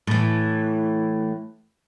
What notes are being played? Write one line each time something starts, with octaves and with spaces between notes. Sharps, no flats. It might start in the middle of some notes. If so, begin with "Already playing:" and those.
A2 E3